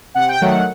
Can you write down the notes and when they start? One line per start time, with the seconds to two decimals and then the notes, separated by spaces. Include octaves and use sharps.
0.14 C3 F#5
0.28 G5
0.41 D#3 F#3 A3 F#5